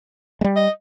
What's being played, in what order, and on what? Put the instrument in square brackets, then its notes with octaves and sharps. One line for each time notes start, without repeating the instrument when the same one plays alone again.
[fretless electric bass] G3 G#3
[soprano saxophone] D#5